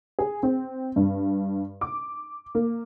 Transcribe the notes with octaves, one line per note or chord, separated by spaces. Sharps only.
G#4
C4
G2
D6
A#3